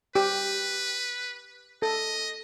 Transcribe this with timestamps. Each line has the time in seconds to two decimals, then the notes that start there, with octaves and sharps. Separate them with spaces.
0.15 G4 B4
1.82 A4 D#5